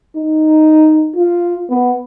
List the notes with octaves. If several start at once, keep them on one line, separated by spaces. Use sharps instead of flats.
D#4
F4
B3